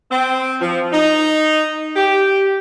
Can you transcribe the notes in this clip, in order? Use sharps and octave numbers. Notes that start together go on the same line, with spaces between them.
C4
F3
D#4
G4